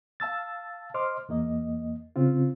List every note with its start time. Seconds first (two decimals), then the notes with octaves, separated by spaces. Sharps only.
0.20 F5 A5 E6 A6
0.94 C5 D#5 C6 D6 F6
1.29 E2 A#3 D#5
2.16 C#3 C4 F4